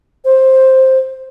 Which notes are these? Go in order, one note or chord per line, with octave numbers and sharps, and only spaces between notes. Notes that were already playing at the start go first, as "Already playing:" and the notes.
C5